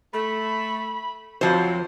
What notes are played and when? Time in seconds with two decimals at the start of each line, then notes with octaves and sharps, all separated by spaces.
0.13 A3 B5
1.41 F2 F3 F#3 C4 F#4 C5